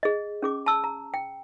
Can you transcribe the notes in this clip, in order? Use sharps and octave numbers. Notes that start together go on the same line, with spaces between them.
G#4 D#5
C#4 G#4 D6
A5 E6
A#5
G5